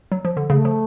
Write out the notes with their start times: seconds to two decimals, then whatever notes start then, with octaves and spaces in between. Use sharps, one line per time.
0.12 F#3
0.25 F3
0.37 D3
0.50 C#3 A3
0.65 F3